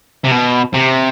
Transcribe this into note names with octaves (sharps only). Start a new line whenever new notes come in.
C3
B2
C3